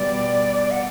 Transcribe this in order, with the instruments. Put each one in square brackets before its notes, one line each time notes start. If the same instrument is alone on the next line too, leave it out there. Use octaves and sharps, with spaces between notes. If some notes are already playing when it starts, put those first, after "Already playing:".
Already playing: [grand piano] B2 G3 B3 [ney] D5
[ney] F#5